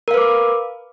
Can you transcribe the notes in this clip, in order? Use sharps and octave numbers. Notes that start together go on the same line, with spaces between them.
A#4 B4 F5 D6